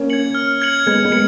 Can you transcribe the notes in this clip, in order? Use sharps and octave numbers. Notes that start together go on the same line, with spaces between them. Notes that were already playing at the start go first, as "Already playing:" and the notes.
Already playing: A#3 C#4
G#6 C#7 F#7
F6
G#6 C#7 F#7
G#3 B3 G#6
G#3 B3
C#7